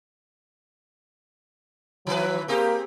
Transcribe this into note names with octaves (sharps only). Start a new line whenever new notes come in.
D#3 E3 F#3 B4
A#3 C4 G4 G#4